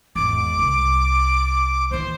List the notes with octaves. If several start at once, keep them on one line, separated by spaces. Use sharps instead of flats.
G#1 E2 D6
C2
D#2 E3 C5